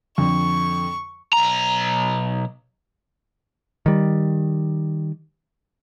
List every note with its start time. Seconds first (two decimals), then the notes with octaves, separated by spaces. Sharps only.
0.18 F2 D3 C#6
1.33 B1 A#5
3.86 D#3 G3